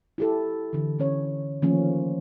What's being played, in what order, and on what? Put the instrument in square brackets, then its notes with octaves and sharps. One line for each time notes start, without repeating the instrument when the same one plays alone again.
[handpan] E4 G4 A4
D3 E3
D3 C#4 C#5
D#3 F3 A3 A#3 C#4